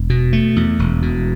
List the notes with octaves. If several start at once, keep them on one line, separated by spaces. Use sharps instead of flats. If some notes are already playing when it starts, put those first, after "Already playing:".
Already playing: E1
B2
A3
E2
E1
B2